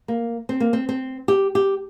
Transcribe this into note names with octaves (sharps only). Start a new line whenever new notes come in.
A#3
C4
A#3
C4
C4
G4
G4